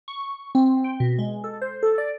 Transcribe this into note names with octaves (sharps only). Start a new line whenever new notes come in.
C#6
C4
G5
B2
G#3
A4
C5
A4
D5